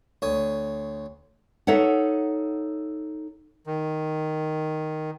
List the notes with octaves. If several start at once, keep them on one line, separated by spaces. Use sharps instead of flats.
D2 C#5 D#6
D#4 A4 C#5 E5 F#5
D#3